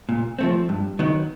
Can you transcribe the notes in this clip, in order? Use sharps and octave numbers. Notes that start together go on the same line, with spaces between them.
A#2
F3 A3 C4
G2
D#3 F#3 B3